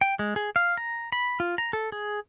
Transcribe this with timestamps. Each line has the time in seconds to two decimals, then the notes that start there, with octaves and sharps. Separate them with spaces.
0.01 G5
0.19 G#3
0.36 G#4
0.56 F5
0.77 A#5
1.12 B5
1.40 F4
1.58 A#5
1.73 A4
1.92 G#4